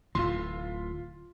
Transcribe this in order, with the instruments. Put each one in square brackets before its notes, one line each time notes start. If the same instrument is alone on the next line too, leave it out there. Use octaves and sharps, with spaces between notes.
[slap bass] D1 A2 E3 [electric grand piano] F4 C6